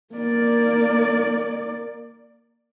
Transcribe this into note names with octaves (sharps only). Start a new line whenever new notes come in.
A#3 D5